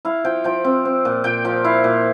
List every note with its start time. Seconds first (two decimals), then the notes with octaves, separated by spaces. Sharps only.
0.05 E4 F5
0.25 F3 G5
0.44 F3 G5
0.64 C4
0.85 C4
1.05 A#2
1.24 A#2 G5
1.45 F3 F5
1.64 E4 F5
1.84 A#2